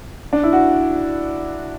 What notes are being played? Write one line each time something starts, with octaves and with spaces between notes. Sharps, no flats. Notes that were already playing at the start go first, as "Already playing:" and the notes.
D4
E4
F#4